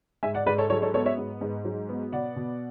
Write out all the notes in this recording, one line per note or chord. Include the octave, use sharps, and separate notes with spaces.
G#2 E5 G#5
D5 F#5
G#2 B4 D5
A4 C#5
F#3 A4 C#5
A4 C#5
B3 A4 C#5
C#5 E5
G#2
G#2
F#3
B3
B2 D5 F#5
B2